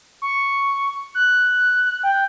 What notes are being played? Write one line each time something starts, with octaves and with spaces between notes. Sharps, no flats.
C#6
F#6
G5